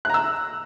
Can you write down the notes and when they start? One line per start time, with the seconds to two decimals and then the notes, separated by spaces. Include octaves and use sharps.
0.05 F#6
0.10 A#5
0.14 E6